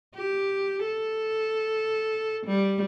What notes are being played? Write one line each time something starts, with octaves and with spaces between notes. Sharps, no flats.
G4
A4
G3